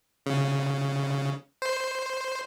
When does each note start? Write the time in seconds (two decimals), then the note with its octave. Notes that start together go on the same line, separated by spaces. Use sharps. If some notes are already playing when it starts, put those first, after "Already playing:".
0.26 C#3
1.62 C5